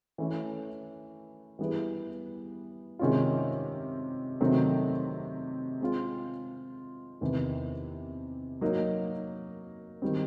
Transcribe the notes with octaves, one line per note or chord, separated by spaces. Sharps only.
E3 A3 C#4
E3 G3 B3 E4 G#4
C3 D#3 G#3 C#4 F4
C3 D#3 F#3 A3 C4
G#3 C4 F4
E2 C3 D#3
F#3 A#3 D#4
D#3 G3 C4